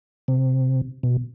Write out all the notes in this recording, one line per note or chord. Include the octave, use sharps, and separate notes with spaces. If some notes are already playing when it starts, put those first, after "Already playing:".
C3
B2